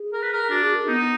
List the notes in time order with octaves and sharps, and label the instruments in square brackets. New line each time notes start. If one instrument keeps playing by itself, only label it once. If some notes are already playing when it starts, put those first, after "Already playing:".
Already playing: [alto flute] G#4
[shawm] A#4
B4
A#4
[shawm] D4 [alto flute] F#4
[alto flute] G#4
A#4
[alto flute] B3 [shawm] D#4